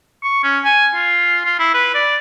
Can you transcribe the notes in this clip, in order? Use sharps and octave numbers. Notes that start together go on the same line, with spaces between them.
C#6
C#4
G#5
F4
F4
E4
B4
D5